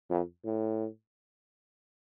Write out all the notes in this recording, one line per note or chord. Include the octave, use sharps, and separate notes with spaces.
F2
A2